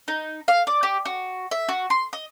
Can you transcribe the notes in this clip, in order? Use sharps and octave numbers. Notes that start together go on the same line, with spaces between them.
D#4
F5
D5
G4
F#4
E5
F#4
C6
D#5